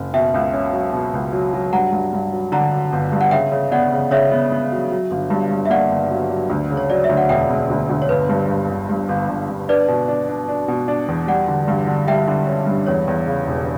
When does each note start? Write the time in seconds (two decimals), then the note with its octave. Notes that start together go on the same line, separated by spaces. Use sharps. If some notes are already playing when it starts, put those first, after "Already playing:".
Already playing: F#1
0.14 B2 E5 G5
0.34 C#2
0.53 C#4
0.73 F#3
0.93 B2
1.14 C#2
1.33 F#3
1.53 F#3
1.73 G2 F#5 A#5
1.92 G2
2.13 G2
2.33 F#3
2.52 D3 F#5 A#5
2.72 F#3
2.93 G1
3.12 G2
3.21 F#5
3.31 C#3 E5 G5
3.52 C#3
3.72 B3 D5 F#5
3.92 C#3
4.11 C#3 C#5 E5
4.31 B3
4.52 B3
4.72 F#3
4.91 F#3
5.11 G1
5.30 G2
5.51 G2
5.66 E5
5.70 A#3 D5 F#5
5.90 G1
6.10 F#3
6.31 F#3
6.50 D2
6.70 C#3
6.77 C#5
6.90 F#3 D5
7.04 E5
7.09 D2
7.17 F#5
7.29 E1 E5 G5
7.50 E1
7.70 D2
7.90 D2
8.02 C#5
8.09 G1 B4
8.29 G2
8.49 G2
8.70 G1
8.89 G2
9.09 G1
9.29 G1
9.49 G1
9.69 D4 B4 D5
9.88 B2
10.08 D4
10.29 D4
10.49 D4
10.68 B2
10.88 D4
11.08 E2
11.27 G3 D5 F#5
11.48 D3
11.68 G2
11.87 D3
12.07 G3 E5 G5
12.27 D3
12.47 C#4
12.67 G2
12.87 E2 C#5
13.08 E2
13.27 C#3
13.47 E1